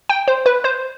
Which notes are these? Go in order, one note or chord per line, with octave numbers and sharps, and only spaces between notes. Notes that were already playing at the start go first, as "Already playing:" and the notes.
G5
C5
B4
C5